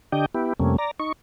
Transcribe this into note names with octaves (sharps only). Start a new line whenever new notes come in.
D3 D4 G4 D#5 G5
B3 E4 G4
F2 C3 G3 A3 A#3 C#4
D5 A#5
D#4 C#6